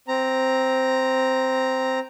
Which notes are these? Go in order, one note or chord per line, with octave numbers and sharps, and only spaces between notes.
C4 A#5